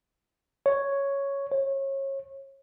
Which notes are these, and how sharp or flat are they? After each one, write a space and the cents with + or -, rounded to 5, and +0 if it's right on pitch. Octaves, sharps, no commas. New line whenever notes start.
C#5 +0
C#5 -30